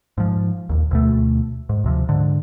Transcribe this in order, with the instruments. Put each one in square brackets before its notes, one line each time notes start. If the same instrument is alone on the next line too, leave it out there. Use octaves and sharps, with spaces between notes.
[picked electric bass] G#2 F3
D#1 A1 D#2
D2 B2 A3
G#2
D2 C3 F3
G#2 D3